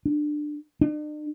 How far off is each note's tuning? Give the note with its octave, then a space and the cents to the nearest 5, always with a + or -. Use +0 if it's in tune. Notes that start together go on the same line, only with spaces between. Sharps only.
D4 +20
D4 +45